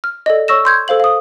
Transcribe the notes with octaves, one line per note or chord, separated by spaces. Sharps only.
F6
A4 D5 D#5
C#5 C#6 E6 A#6 E7
C6 G6 G#6
A4 C5 F5 F#7
F5 D#6